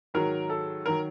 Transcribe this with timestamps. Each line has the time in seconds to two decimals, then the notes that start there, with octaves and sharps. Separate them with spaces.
0.14 G#2 D#3 F#3 A#4
0.50 A4
0.86 D#3 F#3 A#4